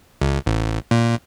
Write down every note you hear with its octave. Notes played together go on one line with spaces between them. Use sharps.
C#2
A1
A#2